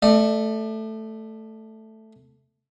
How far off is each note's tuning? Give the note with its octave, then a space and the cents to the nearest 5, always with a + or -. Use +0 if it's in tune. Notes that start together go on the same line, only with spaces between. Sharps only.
A3 +0 D5 +35